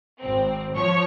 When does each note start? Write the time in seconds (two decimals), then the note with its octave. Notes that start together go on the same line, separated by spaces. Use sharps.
0.20 G#1 C4
0.75 F3 C#5 C#6